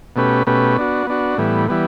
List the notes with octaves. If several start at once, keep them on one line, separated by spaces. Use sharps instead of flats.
B2 A3 C#4 G4 B4
B2 A3 C#4 G4 B4
B3 D4 F#4
B3 D4 F#4
A2 E3 G3 B3
E3 G3 B3